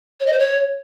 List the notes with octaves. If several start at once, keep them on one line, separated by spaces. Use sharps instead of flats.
C#5
D#5
C5
C#5